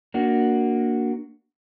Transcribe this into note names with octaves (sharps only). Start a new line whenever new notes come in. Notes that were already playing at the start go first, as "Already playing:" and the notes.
A#3 D4 F#4